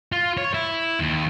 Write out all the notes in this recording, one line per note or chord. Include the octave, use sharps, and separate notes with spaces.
F4
C#5
E4
D#2